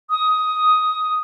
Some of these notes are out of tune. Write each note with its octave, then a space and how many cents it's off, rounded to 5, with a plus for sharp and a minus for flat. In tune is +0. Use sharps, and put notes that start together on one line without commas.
D#6 +10